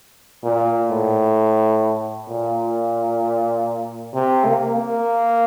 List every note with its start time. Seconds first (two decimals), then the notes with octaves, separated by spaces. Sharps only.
0.44 A#2
0.91 A2
2.30 A#2
4.15 C3
4.45 A#3
4.76 A#3